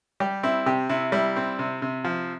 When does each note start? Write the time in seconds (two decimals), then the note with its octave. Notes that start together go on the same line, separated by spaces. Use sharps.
0.20 G3 G4
0.43 C4 E4
0.66 C3 G4
0.89 C3 E4
1.12 G3 E4
1.36 C4
1.59 C3
1.82 C3
2.04 F3